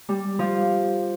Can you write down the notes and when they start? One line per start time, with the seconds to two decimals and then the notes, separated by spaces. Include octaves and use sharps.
0.09 G3
0.39 F3